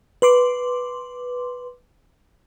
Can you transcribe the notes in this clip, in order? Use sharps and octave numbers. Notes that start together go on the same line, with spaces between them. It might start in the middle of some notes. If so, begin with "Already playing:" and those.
B4 C6 D6